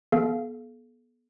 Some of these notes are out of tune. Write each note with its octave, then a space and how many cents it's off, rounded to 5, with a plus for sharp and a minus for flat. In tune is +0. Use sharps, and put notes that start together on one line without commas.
B3 -30 A4 -45 F5 -20